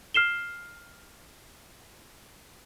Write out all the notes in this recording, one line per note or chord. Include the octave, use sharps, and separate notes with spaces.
F6 C7 E7 G7